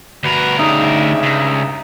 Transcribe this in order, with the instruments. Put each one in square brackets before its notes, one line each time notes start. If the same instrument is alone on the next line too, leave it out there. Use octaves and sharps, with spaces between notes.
[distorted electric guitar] D2 A#4 [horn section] F#4 B4
[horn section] G2 C#3 E5 [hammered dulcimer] D#4
[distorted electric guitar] C#2